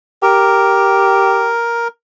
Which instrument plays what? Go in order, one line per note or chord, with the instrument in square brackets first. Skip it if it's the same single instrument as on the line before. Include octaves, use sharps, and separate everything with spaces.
[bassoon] G4 [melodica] A#4